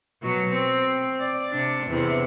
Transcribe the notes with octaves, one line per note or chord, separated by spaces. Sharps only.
B2 F#3 F#4
C4
D5
C3 D4
E2 C3 E4